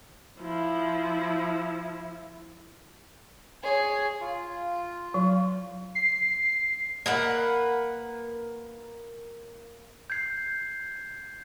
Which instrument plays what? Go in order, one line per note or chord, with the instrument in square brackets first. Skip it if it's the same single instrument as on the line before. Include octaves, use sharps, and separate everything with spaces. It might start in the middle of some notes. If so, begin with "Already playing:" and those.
[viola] F3 E4
[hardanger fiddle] G#4 [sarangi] C#5
[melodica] F4
[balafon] F#3
[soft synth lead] C7
[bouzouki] A#3 B4 F#5
[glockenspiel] G6 G#6 C7